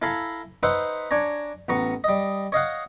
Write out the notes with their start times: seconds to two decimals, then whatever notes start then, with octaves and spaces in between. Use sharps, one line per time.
0.02 E4 A4 F5 G#5 A#5 B5
0.63 D#4 B4 C5 E5 F#5
1.11 D4 C#5 G#5 A#5
1.68 A1 B3 A#5 C#6
2.04 G3 D#5
2.52 C#5 D#5 F5 F#5